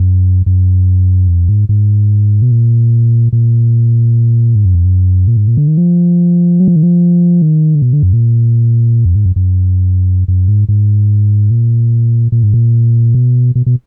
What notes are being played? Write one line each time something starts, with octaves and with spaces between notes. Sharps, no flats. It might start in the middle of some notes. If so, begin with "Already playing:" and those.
Already playing: F#2
F#2
F2
G#2
G#2
B2
A#2
A#2
G#2
F#2
F2
F#2
A#2
G#2
A#2
D3
D#3
F3
F#3
F3
D#3
F3
D#3
D3
B2
D3
F#2
A#2
F2
G#2
F#2
F#2
F#2
G#2
G#2
A#2
A#2
G#2
A#2
B2
B2
B2